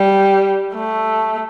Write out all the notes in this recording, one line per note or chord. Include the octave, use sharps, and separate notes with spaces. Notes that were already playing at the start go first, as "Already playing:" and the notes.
Already playing: G3
A3